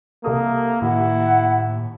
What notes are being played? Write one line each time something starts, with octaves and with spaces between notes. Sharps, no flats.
C2 A#3 A4 D#6
D#2 A2 E4 F#5